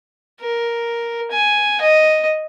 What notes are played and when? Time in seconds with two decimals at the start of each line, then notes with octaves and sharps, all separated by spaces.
0.41 A#4
1.32 G#5
1.81 D#5